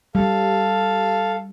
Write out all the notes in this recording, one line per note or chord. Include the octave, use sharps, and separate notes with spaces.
G3 A4 F5